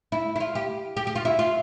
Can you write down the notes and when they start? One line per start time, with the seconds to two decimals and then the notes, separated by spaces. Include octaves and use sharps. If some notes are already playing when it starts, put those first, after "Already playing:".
0.12 E4
0.36 E4
0.40 F4
0.55 G4
0.97 G4
1.07 G4
1.16 F4
1.25 E4
1.39 F4